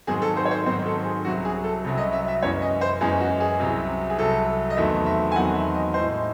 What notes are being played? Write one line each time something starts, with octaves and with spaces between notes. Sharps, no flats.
G#2 D#3 F#3 C4 G#4
A4
C5
C#5
C5
G#2 D#3 F#3 C4 C5
A4
G#4
C2 C3 F#3 C#4 F#4
G#4
A4
C2 C3 F#3 C#4
D#5
E5
E5
F#2 E3 G#3 C#4 C#5
D#5
C5
F#2 E3 G#3 C#4 G#4
F#4
G#4
C2 C3 F#3
G#4
C2 C3 F#3 A4
D#5
E2 D#3 F#3 A3 C4 E5
E5
G#5
E2 D#3 F#3 A3 C4 F#5
E5
D#5
A2 G#3 D#4 C5